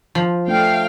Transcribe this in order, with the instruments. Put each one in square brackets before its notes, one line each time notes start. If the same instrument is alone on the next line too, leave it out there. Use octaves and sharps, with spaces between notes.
[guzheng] F3
[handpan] A3 D4 [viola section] F5 G5